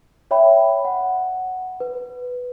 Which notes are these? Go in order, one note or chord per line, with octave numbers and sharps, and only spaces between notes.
C#5 E5 G5 B5
F#5
B4